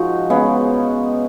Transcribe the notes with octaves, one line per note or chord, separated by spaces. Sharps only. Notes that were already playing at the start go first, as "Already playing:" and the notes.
Already playing: F3 G#3 D#4 F#4
C#3 G#3 B3